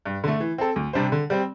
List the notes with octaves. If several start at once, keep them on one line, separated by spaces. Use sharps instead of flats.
G2
D3 A3
E3
C4 A4
D2
C3 G3 D4 C5
D3
G3 C4